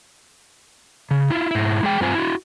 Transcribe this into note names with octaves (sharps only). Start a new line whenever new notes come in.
C#3
E4 F4
G#2 E4
G#3 G#4 G5
G2 C4 F4 C5 G#5
E4 F#4